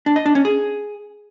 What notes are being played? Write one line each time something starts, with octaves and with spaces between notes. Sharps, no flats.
D4
D#5
D4
C#4
G#4